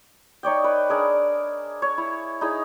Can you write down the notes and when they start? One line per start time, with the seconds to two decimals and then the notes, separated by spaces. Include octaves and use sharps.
0.43 D#4 C#5 D5 G5
0.64 B4
0.89 D4 G#4 A#4
1.82 C#5
1.98 E4
2.41 D#4 E4 G#4 D#5